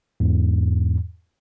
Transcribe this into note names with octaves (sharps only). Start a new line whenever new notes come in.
E2 G#2